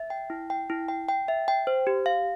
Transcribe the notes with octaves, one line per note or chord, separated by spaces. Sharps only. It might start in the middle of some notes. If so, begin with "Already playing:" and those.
Already playing: E5
G5
E4
G5
E4
G5
G5
E5
G5
C5
G4
F5